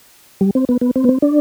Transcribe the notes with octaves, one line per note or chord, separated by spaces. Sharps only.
G3
C4
B3
B3
C4
B3
C4
D4